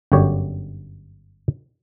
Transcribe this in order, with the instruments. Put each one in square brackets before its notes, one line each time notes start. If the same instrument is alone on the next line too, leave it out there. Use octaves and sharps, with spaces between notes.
[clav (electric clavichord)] G1 F#2 D3 G4 C#5